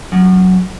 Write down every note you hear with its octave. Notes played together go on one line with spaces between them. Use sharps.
F#2